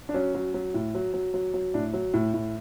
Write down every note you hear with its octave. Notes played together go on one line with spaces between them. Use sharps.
D4
F#3 C#4
F#3
F#3
A2
F#3
F#3
F#3
F#3
A2 D4
F#3
A2
A2